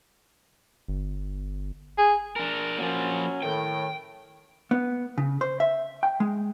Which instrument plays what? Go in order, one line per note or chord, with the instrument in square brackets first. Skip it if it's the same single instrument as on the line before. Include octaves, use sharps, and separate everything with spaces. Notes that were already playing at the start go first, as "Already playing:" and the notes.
[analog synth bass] G1
[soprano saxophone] G#4
[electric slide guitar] D4 A#4
[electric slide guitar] F3 A#3 [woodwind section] F#3 C#4
[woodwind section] A2 D#3 [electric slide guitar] G5
[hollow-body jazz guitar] B3
C#3
C5
E5
G5
G#3